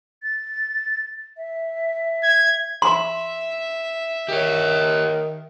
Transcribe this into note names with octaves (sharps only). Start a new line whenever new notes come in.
A6
E5
G#6
E5 C6
D#3 G4 C#5